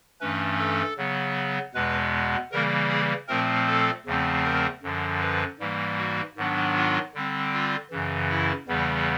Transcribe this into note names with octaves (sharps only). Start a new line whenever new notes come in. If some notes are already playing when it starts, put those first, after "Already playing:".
G2 E3 A3 C#4 B4
A4
C#3 F#3 B3
E2 B2 G#3 B3 B4
C#3 E3 G3 A#3 A#4
G#4
A#2 F3 A3 C4 A#4
A4
E2 C#3 F3 A3 C4
A#4
F#2 D3 F3
B4
G#2 E3 G3 A#3
F#4
G#2 D#3 F#3 B3 D4
F4
D3 G3 C4
F4
F#2 C#3 E3
E4
E2 C#3 E3 G3 B3